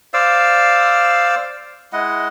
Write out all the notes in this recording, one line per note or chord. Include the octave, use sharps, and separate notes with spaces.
C5 D5 F5 E6
G#3 E4 D#5 F#5